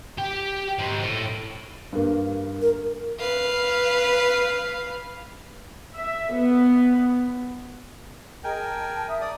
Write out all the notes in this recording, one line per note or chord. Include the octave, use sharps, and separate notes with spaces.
G4 G5
G#2 C4
A2
G2 A#3
A#4
B4 F5
E5
B3
G#4 A#4 D#5 G5 G#5
A5
E5 D#6
D5 E5 D#6